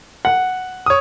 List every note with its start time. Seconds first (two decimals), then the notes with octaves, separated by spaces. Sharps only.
0.25 F#5
0.86 C#5 D#6